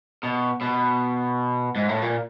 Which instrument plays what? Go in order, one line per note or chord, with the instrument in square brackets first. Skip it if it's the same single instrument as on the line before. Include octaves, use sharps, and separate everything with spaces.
[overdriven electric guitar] B2
B2
G#2
A2
A#2